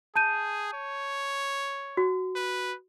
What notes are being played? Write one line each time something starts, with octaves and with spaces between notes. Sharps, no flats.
G#4 A5 G6 D#7
C#5
F#4
B4